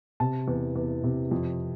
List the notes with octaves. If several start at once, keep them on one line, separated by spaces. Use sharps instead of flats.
C3 A5
E2
E2
C3
F2